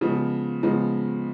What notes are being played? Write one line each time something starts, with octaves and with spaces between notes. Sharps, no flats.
C#3 F3 G#3 B3
C#3 F3 G#3 B3